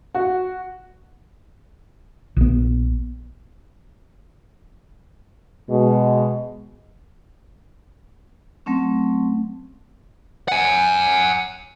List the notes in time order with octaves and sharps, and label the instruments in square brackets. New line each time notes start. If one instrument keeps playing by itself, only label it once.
[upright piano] F#4
[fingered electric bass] A#1 B3
[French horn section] B2 G#3
[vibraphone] F#3 A3 C4 C#4
[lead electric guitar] F#5 G#5